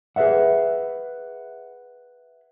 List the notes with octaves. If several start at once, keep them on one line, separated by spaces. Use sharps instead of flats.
G#4 B4 D5 E5 F#5